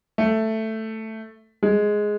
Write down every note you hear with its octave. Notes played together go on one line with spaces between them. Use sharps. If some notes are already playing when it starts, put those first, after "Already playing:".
A3
G#3